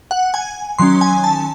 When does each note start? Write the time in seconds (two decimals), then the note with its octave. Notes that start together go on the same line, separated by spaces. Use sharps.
0.11 F#5
0.34 G#5
0.79 D#3 F#3 C#4 C6
1.01 G#5
1.24 A5